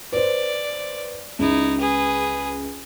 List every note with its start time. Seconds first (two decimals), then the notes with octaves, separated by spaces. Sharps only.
0.12 B4 C5 D5
1.39 C#2 D#4 E4
1.79 G#4 B4